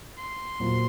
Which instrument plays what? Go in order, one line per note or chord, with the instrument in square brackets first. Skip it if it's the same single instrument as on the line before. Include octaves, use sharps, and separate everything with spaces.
[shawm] C6
[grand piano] A#2 F#3 A#3 F4 C5